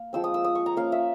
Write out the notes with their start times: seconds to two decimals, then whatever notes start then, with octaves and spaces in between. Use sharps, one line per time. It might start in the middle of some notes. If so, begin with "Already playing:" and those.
Already playing: A#3
0.13 F3 G#3 C4 E6
0.24 D#6
0.34 E6
0.44 D#6
0.55 C#6
0.66 A#5
0.77 A#3 C#4 F4 F5
0.92 E5